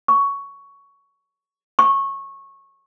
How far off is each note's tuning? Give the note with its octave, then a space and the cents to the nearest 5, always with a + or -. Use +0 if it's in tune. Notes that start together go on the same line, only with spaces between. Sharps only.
C#6 +10
C#6 -20